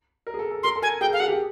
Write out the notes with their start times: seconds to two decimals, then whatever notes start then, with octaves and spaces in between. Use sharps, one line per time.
0.27 A#4
0.34 G#4
0.39 A4
0.51 A4
0.63 A#4 C6
0.76 A4
0.82 A#4 G#5
1.01 G#4 G5
1.10 A4
1.13 F5
1.20 G#4 F#5
1.28 G4